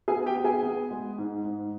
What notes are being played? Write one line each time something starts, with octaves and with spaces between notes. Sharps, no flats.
B3 G#4 G#5
G4 G5
B3
G#4 G#5
B3
G#3
G#2
G#2